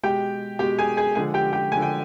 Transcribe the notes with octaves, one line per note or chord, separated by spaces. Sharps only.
B2 G#3 G4 G5
B2 G#3 G4 G5
G#4 G#5
G#4 G#5
D3 F3 G#3 G#4 G#5
G4 G5
G4 G5
D3 F3 G#3 G#5
G5